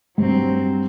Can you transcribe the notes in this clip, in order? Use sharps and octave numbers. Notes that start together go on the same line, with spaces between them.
G2 F#3 C4